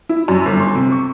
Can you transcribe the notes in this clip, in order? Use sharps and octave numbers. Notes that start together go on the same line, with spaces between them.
E4
F#2
G1
C6
C3
C#6